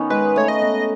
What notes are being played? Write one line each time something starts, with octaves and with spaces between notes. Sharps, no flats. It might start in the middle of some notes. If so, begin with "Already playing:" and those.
Already playing: D#3 B3 C#4 D#4
G#3 B4
A3 C#5
D#5
B3